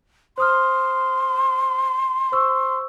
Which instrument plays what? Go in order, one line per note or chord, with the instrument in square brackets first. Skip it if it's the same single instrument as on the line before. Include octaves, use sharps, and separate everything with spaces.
[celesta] C5 D#6 F6 [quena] C6
[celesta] C5 C#6 E6